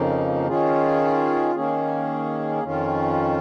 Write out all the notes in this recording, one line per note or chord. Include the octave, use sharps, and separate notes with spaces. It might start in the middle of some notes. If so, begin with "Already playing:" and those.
Already playing: F2 C#3 F3 A#3 D#4
D#3 C#4 F4 G#4
D#3 A#3 C#4 G#4
F2 D#3 C#4 F4